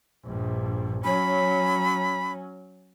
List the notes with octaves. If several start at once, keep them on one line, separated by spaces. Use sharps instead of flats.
A#1 G2
F#3 C#4 B5